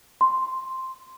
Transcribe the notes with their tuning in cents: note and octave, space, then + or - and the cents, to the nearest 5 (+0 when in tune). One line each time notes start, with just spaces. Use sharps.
C6 +0